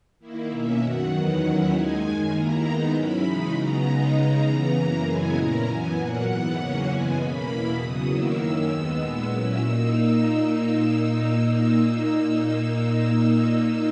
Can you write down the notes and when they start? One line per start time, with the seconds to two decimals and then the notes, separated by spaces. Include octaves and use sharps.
0.20 D#3 A#3 E4
0.50 B2 A#3 C#4 E5
0.80 F#2 D#3 F#3 F#5
1.10 E2 D#3 F#3 B3 F#5
1.41 D#2 D#3 F#3 C#4 E4 F#5
1.71 D#2 D#3 G#3 D#4 G#5
2.01 F#2 D#3 G#3
2.32 D#2 D#3 A#3 E4 A#5
2.62 D#3 G#3 B3 D#4
2.92 G#2 F#3 C#4 E4 B5
3.23 C#3 E3 G#3 D#4
3.52 C#3 F#3 B3 A#5
3.83 C#3 G#3 B3 D#4
4.14 C#3 G#3 D#4
4.44 C#3 E3 B3 A#5
4.74 F#2 E3 A#3
5.04 F#2 C#3 E3 G#3 B3 G#5
5.34 A#2 A#3 C#4 E4 A#5
5.65 F#2 E3 B3 G#5
5.95 A#2 F#3 A#3 F#5
6.25 G#2 E3 B3 F#5
6.55 E2 C#3 F#3 A#3 C#4 F#5
6.85 F#2 C#3 E3 G#3 B3 G#5
7.16 B2 A#3 C#4 B5
7.46 E2 B2 A#3 E4
7.76 E2 C#3 F#3 B3 D#6
8.07 D#3 F#3 A#3 E4 E6
8.37 F#2 D#3 A#3 C#4
8.67 D#2 D#3 G#3 B3 E6
8.98 A#2 G#3 B3
9.28 A#2 F#3 C#4 E4 E6
9.58 A#2 A#3 D#4